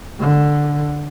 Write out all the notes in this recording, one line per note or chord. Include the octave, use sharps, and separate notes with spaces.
D3